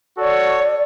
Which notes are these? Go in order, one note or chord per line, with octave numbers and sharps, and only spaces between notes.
F#4 A4 C#5 D5